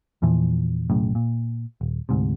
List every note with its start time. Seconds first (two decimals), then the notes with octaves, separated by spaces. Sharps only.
0.22 E2 A#2 E3 F3
0.90 B1 F#2 A2 C#3
1.15 A#2
1.81 D#1
2.09 D2 G#2 C3